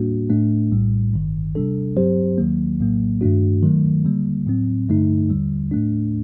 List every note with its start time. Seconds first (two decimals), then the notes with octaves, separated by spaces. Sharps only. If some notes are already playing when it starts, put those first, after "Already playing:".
Already playing: A2 G3 A#3 D4 F#4
0.30 A2 A3 D4
0.71 A#1 A2 G3
1.13 G1 G2 D#3
1.55 C3 G3 D4 A4
1.97 G2 F#3 C4 G4 C5
2.38 D#2 D#3 F#3 A#3
2.80 A#1 A2 F#3 A#3
3.21 G2 D#3 A3 D4 F#4
3.63 D#3 F#3 A3
4.05 D3 G3 A#3
4.47 A2 F#3 C4
4.88 G2 D3 A3 D#4
5.30 D#2 D3 G3
5.72 A2 A3 D4